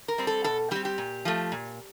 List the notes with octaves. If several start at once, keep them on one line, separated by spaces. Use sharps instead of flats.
A#4
G3 C4
A4
B2 A4
G3 C4 G4
G4
A#2
F3 A3
A#2